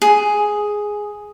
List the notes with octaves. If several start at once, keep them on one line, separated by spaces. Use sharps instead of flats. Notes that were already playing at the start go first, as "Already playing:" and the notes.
G#4